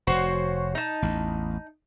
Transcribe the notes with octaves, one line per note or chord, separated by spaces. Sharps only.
F1 F#4 C5 C#5
D#4 A5
A1 E2